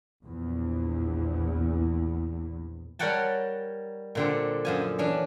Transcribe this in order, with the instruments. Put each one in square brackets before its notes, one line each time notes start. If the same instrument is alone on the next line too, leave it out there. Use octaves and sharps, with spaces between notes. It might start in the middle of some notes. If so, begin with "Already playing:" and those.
[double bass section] A#1 E2
[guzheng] G3 A#4 C#5 F#5 G5 A5
A#2 D3 C4
F#2 F3 G#5
E3 C#4 D4